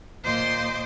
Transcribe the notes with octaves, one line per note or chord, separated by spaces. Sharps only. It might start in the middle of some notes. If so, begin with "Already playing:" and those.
D#2 A#2 C5 D#5 C6 D6